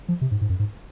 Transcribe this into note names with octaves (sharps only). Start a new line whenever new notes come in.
F3
C3
G#2
G#2
F#2
G#2